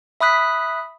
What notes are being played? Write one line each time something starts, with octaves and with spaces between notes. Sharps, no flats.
E5 B5 D#6 F#6 B6